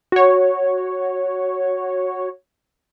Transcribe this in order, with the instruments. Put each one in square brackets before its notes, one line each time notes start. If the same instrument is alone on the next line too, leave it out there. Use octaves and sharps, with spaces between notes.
[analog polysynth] F#4 C#5